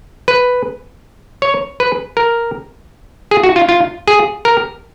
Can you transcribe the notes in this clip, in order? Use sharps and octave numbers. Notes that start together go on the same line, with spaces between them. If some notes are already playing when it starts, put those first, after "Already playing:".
B4
C#5
B4
A#4
G#4
F#4
F4
F4
G#4
A#4